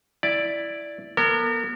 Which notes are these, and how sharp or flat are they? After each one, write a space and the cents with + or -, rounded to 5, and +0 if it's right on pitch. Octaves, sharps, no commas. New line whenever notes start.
E4 +0 D5 +0
B3 -40 A#4 -40